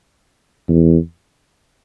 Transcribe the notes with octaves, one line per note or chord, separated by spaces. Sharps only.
E2